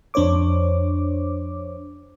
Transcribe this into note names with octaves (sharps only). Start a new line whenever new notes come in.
F2 D4 C5 C#5 D6